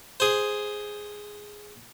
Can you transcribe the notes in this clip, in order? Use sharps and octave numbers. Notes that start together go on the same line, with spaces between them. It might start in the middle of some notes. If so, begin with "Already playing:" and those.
G#4 C5